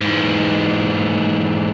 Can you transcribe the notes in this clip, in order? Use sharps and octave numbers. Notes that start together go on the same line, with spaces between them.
G#2 E3